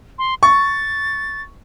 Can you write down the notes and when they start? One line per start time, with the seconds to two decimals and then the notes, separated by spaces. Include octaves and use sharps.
0.18 C6
0.43 C#6 A6